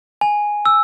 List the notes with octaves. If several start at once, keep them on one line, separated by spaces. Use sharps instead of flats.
G#5
E6